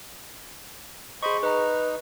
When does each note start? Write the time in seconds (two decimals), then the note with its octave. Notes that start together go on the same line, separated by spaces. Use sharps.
1.23 G#4 C5 D#5 B5 C#6
1.43 D#4 B4 A#5